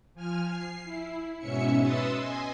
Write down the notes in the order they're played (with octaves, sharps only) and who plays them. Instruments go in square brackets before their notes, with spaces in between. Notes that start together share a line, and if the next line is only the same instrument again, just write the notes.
[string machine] F3 G#5 F6
C7
E4
G#2 B2 C#4 E5 C#7
B4 E5 C6 D#6 E6 A6
D#5 G#5 C6